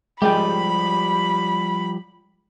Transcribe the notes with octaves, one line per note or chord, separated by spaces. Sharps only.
F3 G3 G#3 G4 G5 B5